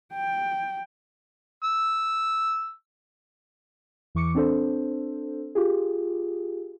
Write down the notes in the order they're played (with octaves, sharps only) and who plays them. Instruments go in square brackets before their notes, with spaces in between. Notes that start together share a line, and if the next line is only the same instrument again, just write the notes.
[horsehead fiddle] G5
[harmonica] E6
[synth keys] E2 E3 C#6 D6 C#7
C4 D4 A4 C5
F4 G4 G#4